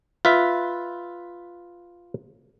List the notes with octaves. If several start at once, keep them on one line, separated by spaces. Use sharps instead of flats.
F4 B4 E5